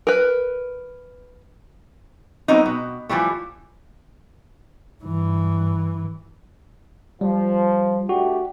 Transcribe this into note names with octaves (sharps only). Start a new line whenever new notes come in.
A#4 B4
F#3 B3 C4 D#4
B2
E3 F3 G3 A3
G2 E3
F3 G3
A3 D4 F#4 G4